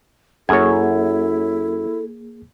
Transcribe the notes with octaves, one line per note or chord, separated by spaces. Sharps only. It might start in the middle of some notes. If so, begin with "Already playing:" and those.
F#2 A#3 E4 G#4 A4 C#5 G#6